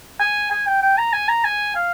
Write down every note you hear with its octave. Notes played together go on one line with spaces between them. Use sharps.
G#5
G#5
G5
G5
A#5
G#5
A#5
G#5
F5